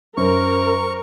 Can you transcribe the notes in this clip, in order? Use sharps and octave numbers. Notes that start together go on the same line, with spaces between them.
F#2 A#4 C5 C#6